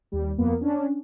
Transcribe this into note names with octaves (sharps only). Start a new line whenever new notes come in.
D#2 G3
F2 A#3 B3
C#4 D4